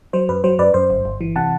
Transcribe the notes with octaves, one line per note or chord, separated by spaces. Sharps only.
F#3 C5
F#2 B4
F#3 C5
F#2 B4 D5
F#2 C5
G1
G1
E3
C3 F#5 A5